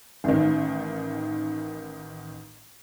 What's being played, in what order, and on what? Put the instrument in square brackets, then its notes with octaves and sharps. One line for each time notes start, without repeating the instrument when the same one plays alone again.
[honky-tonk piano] A1 D#3